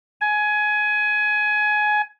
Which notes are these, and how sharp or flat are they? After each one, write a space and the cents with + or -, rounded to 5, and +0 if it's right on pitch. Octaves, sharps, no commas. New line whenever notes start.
G#5 +20